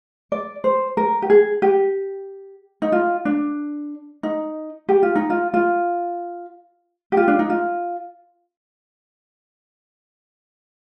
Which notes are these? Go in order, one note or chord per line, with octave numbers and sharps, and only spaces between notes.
D5
C5
A#4
G4
G#4
G4
D#4
F4
D4
D#4
G4
F4
D#4
F4
F4
G4
F4
D4
D#4
F4